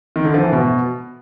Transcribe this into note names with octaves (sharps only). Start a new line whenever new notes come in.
D#3
D3
F3
E3
B2